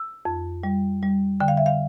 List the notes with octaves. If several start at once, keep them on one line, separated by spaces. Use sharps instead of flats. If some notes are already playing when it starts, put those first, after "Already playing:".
Already playing: E6
F2
G3
G3
D3 G5
F5
E5
F5